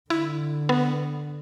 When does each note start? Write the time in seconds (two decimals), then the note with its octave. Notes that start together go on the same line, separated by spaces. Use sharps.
0.10 D3 E4
0.69 B3